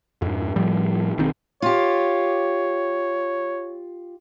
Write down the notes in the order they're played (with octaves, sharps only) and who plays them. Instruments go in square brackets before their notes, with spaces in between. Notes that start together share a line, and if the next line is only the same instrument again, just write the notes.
[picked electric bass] F2 G#2
A2 F3 G3
B1 D#3 C4
[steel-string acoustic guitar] F4 G4 [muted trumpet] C#5